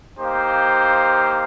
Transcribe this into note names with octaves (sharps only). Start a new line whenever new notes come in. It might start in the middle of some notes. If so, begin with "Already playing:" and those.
A#3 D#4 G4 C5 F5